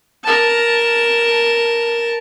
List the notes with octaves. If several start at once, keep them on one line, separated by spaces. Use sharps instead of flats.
A#4 A5